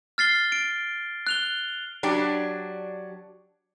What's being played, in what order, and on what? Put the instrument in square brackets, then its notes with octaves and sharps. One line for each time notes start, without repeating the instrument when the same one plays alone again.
[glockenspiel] F6 A6 C7 G7
D7
F#6 F7 G7
[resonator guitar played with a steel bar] F#3 D4 G4